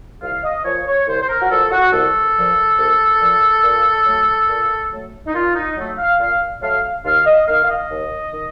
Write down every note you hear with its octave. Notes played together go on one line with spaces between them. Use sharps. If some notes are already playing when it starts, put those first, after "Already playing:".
C2 F5
D#5
A#2 F3 C#5
C#5
C2 C5
C5
A#4
F#4
A#2 F3 A4
F#4
C2 A4
A#2 F3
C2
A#2 F3
A#2
F#3 A3
A#2
F#3 A3
D#4
A#2 F4
D#4
F#3 A3
F5
A#2 F5
F#3 A3 F5
D#2 F5
D#5
D#3 A#3 F5
F5
D#5
D#2
D#3